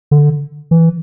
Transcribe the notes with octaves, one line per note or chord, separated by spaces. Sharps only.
D3
E3